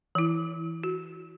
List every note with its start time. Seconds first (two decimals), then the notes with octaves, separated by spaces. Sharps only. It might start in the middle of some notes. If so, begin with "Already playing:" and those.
0.15 E3 E4
0.84 F#4